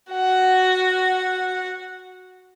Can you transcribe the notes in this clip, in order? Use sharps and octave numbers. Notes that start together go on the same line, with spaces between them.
F#4 F#5